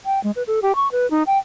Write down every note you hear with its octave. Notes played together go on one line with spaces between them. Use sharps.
G5
G#3
B4
A4
G4
C#6
B4
D#4
G5